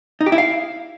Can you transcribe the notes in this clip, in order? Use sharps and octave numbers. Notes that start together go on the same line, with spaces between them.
D#4
G4
E4
F5